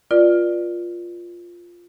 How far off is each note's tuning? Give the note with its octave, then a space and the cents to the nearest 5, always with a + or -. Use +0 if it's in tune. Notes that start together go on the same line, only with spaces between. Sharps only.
F4 +0 B4 -40 D5 +15